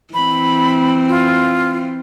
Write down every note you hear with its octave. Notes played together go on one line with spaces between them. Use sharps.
E3 C4 B5
F4